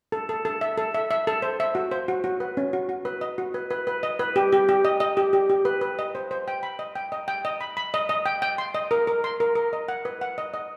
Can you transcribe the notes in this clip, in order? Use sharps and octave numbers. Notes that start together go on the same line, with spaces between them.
A4
A4
A4
E5
A4
E5
E5
A4
C5
E5
F#4
C5
F#4
F#4
B4
C#4
F#4
F#4
B4
D#5
F#4
B4
B4
B4
D#5
B4
G4
G4
G4
D#5
D#5
G4
G4
G4
B4
B4
D#5
C5
C5
G5
B5
D#5
G5
D#5
G5
D#5
B5
B5
D#5
D#5
G5
G5
C6
D#5
A#4
A#4
C6
A#4
A#4
D#5
F#5
B4
F#5
D#5
D#5